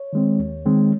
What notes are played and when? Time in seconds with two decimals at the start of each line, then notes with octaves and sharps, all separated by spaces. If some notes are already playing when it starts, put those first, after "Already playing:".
Already playing: C#5
0.13 D#3 G#3 C4
0.39 D#2
0.66 D#3 G#3 C4